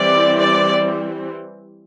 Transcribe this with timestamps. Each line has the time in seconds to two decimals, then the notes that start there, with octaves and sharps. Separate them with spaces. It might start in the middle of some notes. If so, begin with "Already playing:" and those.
Already playing: E3 G3 C4 D5
0.40 D5